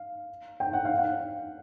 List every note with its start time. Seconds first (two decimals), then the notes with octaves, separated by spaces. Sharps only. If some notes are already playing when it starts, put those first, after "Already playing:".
Already playing: F5
0.60 G5
0.73 F#5
0.85 F5
0.98 F#5